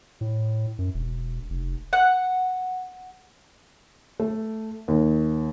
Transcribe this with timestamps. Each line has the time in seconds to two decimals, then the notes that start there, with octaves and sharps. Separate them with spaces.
0.21 A2
0.79 F#2
0.94 E1
1.50 F1
1.93 F#5
4.20 A3
4.88 D#2